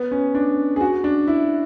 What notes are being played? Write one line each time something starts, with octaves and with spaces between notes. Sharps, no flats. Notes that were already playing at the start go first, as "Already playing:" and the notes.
Already playing: B3
C#4
D4
G#4
F#4
D4
E4